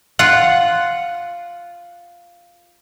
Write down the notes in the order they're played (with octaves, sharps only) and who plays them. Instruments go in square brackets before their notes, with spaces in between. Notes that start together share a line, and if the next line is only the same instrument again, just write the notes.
[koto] F4 F#5